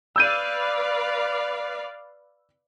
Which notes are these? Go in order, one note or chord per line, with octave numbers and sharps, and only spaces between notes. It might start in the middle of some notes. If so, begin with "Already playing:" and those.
B4 D5 F5 E6 G6 D#7